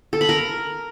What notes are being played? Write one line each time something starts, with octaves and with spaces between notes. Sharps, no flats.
A4
B5
A#4